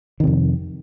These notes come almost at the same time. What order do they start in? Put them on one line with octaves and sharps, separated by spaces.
D#3 C3 F2